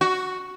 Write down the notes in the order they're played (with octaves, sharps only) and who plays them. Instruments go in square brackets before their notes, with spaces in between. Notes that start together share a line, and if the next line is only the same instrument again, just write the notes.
[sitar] F#4